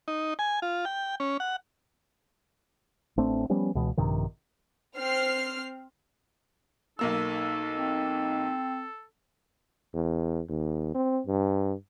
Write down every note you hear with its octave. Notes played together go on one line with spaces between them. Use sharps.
D#4
G#5
F4
G5
C#4
F#5
A1 A3 C4 D4
F3 G3 B3 C#4
C#2 B2 E3
A#1 G2 C3 D#3
C4 F6 C7
B1 A#3 D#4 A4 E6
C4
E2
D#2
C4
G2